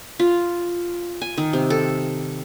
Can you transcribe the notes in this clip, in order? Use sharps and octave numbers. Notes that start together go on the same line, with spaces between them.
F4
G#5
D#3
C3
A4